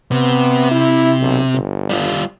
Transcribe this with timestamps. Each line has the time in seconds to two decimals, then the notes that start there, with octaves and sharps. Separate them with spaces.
0.12 C3 B3
0.71 E4
1.21 B1
1.54 G1
1.90 G3 F4